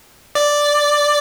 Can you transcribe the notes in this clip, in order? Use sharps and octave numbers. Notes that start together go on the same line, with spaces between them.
D5